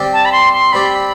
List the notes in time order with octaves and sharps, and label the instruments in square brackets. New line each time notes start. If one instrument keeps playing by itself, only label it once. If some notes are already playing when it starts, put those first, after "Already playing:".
Already playing: [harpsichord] G3 C4 G4 D5
[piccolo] A5
B5
C6
C6
[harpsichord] G3 C4 G4 D5 [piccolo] B5